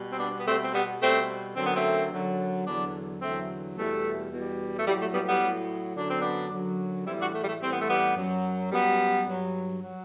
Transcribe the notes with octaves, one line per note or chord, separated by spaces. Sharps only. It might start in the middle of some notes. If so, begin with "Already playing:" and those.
Already playing: B2 G3
C4
B3 D4
B3
B2 G3 A3 C4
C4
G3 B3
B2 G3 A3 C4
F#2 D3 F#3 C4
B3
A3 C4
F#2 D3 F#3
E2 D3 F#3 B3 D4
E2 D3 F#3 A3 C4
E2 B2 G3 A3
E2 B2 G3
A3
A2 F#3 G3
A3
G3 B3
G3 B3
A2 F#3
F#2 D3 F#3 D4
C4
B3 D4
F#2 D3 F#3
A2 E3 G3 C4 E4
D4 F#4
A3
G3
A3
A2 E3 G3 C4
B3
A3
G3 B3
F#2 F#3
F#2 F#3 G3 B3
G2 F#3
F#3